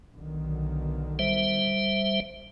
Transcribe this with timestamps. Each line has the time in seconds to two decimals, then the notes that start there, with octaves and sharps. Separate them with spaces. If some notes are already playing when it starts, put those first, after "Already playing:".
0.15 B1 D3 D#3
1.19 G3 C5 E5